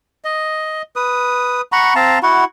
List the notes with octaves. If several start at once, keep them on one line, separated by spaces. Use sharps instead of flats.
D#5
B4 D#6
F#5 A#5 B5 C#6
C4 F5 A5 A#5
E4 F#4 F#5